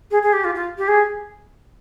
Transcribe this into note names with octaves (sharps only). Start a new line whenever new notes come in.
G#4
G#4
G4
F4
F4
G4
G#4